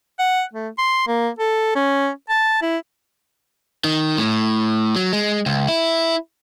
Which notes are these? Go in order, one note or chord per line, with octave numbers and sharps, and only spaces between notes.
F#5
A3
C6
A#3
A4
C#4
A5
E4
D#3
A2
F#3
G#3
C#2
E4